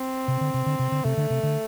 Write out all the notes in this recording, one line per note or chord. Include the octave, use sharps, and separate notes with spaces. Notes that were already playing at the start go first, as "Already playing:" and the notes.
Already playing: C4
C3
D3
C3
D3
C3
D3
C3 A3
D3
C3
D3